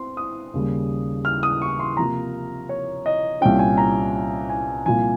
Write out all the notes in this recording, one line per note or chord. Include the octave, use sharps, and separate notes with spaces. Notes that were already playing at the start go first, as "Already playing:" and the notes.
Already playing: C4 C6
D#6
D#2 C#3 G3
F6
D#6
C#6
C6
C3 F3 A#3 F4 A#5
C#5
D#5
C2 A#2 G3 C#4 G5
G#5
A#5
G#5
C2 A#2 F3 G#5